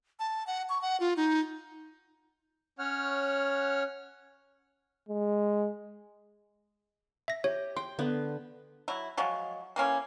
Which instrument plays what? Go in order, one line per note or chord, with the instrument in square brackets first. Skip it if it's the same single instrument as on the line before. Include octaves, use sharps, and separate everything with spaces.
[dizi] A5
F#5
C#6
F#5
F4
D#4
[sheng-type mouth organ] C#4 C#5 F#5 F6
[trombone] G#3
[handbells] E5 A#6
[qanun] G4 [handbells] C#5
[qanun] G5 [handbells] C6
[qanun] D3 B3
[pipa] F#3 E4
F3 F#3 G#3
E3 A#3 C#4